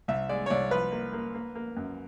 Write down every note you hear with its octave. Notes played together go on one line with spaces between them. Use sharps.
C2 E5
G#3 D5
C#5
C2 D5
F3 B4
A#3
A#3
A#3
A#3
F#2